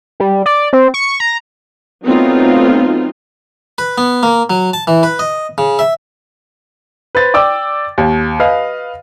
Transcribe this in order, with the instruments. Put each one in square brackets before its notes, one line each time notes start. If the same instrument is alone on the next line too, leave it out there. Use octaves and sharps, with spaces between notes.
[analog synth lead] G3
D5
C4
C#6
A#5
[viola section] F#3 A3 B3 C4 D#4 F4
[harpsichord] B4
B3
A#3
F#3
A5
E3
B4
D#5
C#3
E5
[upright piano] B4 C5 A6
D5 G5 D6 E6
D#2
B4 D#5 F5